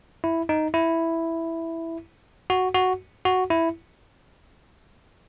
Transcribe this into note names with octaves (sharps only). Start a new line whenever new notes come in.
E4
D#4
E4
F#4
F#4
F#4
E4